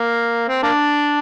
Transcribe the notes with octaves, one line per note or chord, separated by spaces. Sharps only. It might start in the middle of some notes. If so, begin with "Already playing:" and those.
Already playing: A#3
C4
A#3 D4